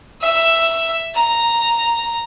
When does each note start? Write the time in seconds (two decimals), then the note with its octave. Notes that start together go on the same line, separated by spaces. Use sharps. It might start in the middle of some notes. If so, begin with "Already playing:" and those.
0.21 E5 E6
1.15 A#5